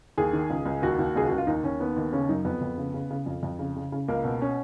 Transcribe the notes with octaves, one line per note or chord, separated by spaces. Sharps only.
D#2 G#4
D#3
C#2
C#2
D#2 F#4
D#2
C#2 G#4
C#2 F#4
F4
D#2 D#4
D#2 C#4
D#3 B3
D#2
C#3 C#4
F#2 D#4
F2 B3
F2
C#3
C#3
C#3
F2
F2
C#3
C#3
C#3
C#2 A#3
B2
C#4